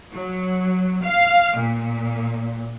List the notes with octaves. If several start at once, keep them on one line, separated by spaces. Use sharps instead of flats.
F#3
F5
A#2